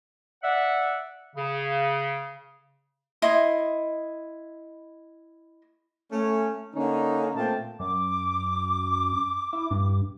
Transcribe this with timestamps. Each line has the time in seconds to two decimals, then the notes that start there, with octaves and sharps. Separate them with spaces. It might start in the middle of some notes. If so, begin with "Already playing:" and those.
0.43 D5 E5 F#5
1.36 C#3
3.22 E4 D#5 C6
6.11 A3 C#4
6.75 D3 A#3 C#4 D#4
7.35 A#2 A3 A#3 C4 G5 A5
7.80 F#2 D6
9.53 E4
9.71 G2